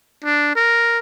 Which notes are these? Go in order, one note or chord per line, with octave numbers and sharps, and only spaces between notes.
D4
A#4